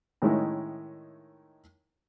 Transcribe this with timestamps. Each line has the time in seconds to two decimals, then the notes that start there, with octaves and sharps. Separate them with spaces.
0.22 A2 D#3 G#3 C#4 D#4 E4